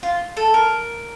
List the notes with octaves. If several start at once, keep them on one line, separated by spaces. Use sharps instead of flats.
F4
A4
A#4